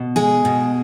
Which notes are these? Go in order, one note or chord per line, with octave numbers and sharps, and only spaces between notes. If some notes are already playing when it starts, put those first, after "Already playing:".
Already playing: B2
G#3 G#4
B2